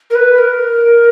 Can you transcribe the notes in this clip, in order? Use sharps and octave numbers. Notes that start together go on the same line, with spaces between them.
A#4
B4
A#4